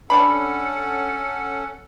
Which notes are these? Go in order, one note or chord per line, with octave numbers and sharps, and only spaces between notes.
G3 C#4 D4 A4 F#5 B5